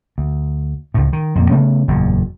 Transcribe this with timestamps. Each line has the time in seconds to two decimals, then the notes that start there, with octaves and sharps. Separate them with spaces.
0.18 D2
0.94 C#2 A2
1.13 D#3
1.35 F2 A#2 A#3
1.51 C#3 A3 B3
1.88 F#1 E2 A#2